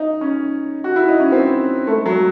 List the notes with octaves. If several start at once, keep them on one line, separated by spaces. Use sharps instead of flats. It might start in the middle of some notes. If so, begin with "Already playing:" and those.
Already playing: D#4
C#4
F#4
E4
D#4
C#4
C4
A3
F#3